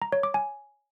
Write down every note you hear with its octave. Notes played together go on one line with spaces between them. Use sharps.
A#5
C#5
D6
G#5